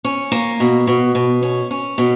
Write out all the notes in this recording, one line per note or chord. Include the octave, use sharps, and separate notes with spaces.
C#4
A#3
B2
B2
B2
C#4
C#4
B2